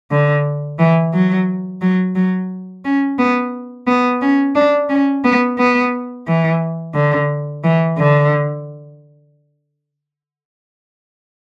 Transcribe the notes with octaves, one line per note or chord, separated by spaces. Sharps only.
D3
E3
F#3
F#3
F#3
C#4
B3
B3
C#4
D4
C#4
B3
B3
E3
D3
E3
D3